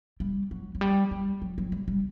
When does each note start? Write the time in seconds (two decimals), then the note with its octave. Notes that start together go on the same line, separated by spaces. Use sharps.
0.20 G3
0.51 F#3
0.75 F#3
0.81 G3
1.11 G3
1.42 F#3
1.58 F#3
1.72 G3
1.88 G3